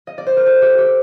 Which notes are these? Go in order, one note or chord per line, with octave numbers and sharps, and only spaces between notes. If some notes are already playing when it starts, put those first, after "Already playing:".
D#5
D5
C5
A#4
A4
G4
G4